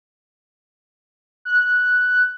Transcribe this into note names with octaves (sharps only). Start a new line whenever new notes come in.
F#6